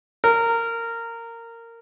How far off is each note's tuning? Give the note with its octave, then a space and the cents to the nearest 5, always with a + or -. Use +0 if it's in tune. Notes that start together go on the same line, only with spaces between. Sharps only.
A#4 -15